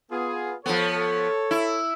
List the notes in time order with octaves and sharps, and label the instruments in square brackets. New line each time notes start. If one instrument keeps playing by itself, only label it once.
[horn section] B3 F4 G#4
[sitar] F3 B3 [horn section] A4 C#5
[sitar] E4